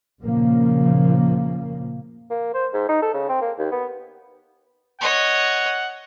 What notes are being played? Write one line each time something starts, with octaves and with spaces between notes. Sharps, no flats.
A#2 C#3 F3 A#3
A#3
C5
G#2
D#4
A4
C#3
C4
A#3
D#2
B3
C#5 D#5 F#5